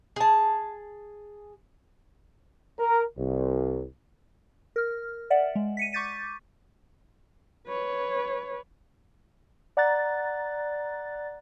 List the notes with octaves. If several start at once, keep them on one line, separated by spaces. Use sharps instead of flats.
G#4 A5
A#4
C2
A#4 F6
D5 E5 F#5
G#3
B6 C#7 D#7
C#6 D6 G6 A6 B6 D#7
B4 C#5
D5 F#5 A#5 F#6 A6